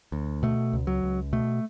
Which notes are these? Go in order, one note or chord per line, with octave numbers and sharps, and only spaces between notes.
D2
B2 A3
C#2
F#3
C#2
B2 A3